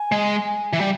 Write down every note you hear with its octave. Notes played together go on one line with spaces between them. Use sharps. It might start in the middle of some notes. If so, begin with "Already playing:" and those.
Already playing: G#5
G#3
E3
G3